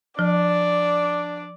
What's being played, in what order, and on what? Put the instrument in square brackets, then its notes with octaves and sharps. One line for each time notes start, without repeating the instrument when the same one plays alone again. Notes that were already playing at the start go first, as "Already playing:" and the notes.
[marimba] F3 [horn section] D4 [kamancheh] D5